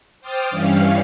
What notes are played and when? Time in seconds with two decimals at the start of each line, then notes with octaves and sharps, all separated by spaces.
0.21 C5 G5 D6 D#6 F6 A6
0.51 G2 E3 G3 C#4 F5